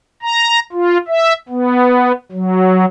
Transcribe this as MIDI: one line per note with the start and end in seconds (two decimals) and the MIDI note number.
0.22 0.59 82
0.72 0.98 65
1.08 1.33 76
1.49 2.12 59
2.32 2.85 54